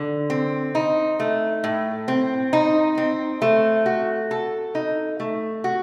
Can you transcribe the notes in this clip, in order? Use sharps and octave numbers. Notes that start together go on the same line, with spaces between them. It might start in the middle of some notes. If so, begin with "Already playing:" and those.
Already playing: D3
C4
D#4
A3
A2
C4
D#4
C4
A3
F#4
A4
D#4
A3
F#4